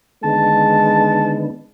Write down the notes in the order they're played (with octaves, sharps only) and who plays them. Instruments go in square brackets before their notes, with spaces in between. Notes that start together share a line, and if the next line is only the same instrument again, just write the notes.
[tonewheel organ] D3 D#3 B3 [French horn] G#3 [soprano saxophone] A5